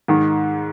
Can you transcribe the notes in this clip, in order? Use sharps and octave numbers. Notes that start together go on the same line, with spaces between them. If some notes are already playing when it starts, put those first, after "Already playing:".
G#2 D#3